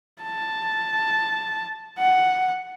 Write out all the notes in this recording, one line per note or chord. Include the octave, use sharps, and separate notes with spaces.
A5
F#5